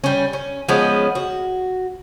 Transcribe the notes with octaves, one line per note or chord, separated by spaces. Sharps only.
G3 C#4
C#4
F3 G#3 B3 C#4
F#4